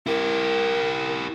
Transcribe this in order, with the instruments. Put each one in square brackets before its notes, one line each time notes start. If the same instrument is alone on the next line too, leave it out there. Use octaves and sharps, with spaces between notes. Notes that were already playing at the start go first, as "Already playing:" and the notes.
[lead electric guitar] E4 G4 [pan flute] A#4